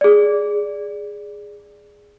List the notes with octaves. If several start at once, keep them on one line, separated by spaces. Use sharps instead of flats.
G#4 D5